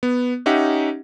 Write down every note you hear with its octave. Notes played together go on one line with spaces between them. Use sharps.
B3
C#4 D#4 G4 E5 F#5